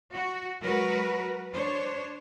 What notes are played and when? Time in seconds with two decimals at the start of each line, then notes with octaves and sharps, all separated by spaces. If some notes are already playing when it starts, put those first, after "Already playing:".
0.13 F#4
0.62 F#3 G#3 F#4 A#4 B4
1.53 D4 C5 C#5